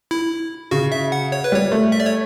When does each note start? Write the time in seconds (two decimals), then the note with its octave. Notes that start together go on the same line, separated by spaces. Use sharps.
0.11 E4
0.71 C#3 F#4
0.92 E5
1.12 F#5
1.32 C#5
1.44 B4
1.52 G3 C#5
1.72 A3
1.92 E5
2.00 D5
2.06 C#5